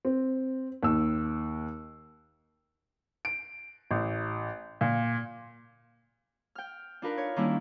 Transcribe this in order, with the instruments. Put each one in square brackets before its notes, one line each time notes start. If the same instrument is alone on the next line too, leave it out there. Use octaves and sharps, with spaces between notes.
[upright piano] C4
D#2 E6
D7
A1
A#2
[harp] G5 F6
D4 D#4 F4 A#4 B4
C#5
D#3 G3 A#3 C#4 D4 E4